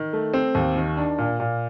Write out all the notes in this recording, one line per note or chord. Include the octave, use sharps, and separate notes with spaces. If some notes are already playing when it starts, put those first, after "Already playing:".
Already playing: D#3
A3
C4
D#2
D#3
D4
A#2
A#2